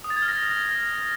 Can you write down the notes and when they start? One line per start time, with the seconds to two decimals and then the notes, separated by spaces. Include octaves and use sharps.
0.04 D#6
0.10 A6
0.16 G#6
0.22 F6
0.28 A#6